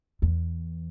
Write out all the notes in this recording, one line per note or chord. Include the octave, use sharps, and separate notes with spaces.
E2